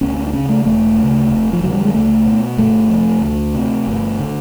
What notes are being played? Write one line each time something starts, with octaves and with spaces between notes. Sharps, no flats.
D2 C#4
C#4
D4
C#3 C#4
A3
E1 A3
D2 C#3
F1
F3
F2 D3 F#3
G3
G#3
C#2 A3
B2
G1 A3
F2 C3
D2
C3
G1
D3